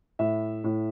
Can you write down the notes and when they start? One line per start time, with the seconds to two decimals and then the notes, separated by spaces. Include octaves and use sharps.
0.19 A2 E5
0.64 A2